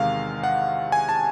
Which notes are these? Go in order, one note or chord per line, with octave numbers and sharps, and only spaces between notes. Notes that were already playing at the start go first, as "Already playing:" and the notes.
Already playing: E2 C3 D#3 G#3 F5
F#5
G#5
A5